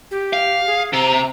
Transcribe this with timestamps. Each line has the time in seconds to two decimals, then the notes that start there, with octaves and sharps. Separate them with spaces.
0.11 G4
0.33 F5
0.66 G#4
0.93 C3 A#5